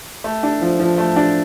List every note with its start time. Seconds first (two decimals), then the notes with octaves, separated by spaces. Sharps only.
0.24 A3
0.43 D4
0.61 F3
0.80 F3
0.98 A3
1.16 D4